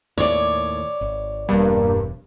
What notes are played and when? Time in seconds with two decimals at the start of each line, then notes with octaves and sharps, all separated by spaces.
0.18 D#2 A2 C#5 D5
1.01 G#1
1.49 E1 G2 A#3